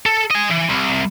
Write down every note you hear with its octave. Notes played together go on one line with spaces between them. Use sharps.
A4
D#5 G#5
E3
C2